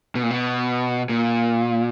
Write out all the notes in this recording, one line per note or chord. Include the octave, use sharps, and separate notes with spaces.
B2
A#2
B2
A#2